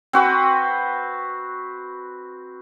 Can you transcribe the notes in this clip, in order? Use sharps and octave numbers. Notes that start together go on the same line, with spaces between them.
C4 F#4 B4